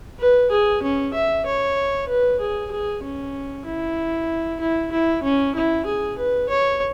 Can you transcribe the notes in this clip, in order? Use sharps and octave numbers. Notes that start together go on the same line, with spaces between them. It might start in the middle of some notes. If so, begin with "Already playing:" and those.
B4
G#4
C#4
E5
C#5
B4
G#4
G#4
C#4
E4
E4
E4
C#4
E4
G#4
B4
C#5